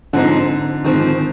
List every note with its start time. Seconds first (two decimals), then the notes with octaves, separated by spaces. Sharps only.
0.13 G#2 D3 F3 C4 D#4
0.84 G#2 D#3 F3 C4 D#4